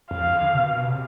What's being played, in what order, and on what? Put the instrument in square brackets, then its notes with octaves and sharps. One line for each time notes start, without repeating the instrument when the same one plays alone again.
[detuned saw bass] F2 [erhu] F5
[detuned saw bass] D3
B2
B2
C3